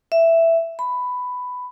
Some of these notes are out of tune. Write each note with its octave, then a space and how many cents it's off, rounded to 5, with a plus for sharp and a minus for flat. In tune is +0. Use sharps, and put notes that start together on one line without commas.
E5 +5
B5 +10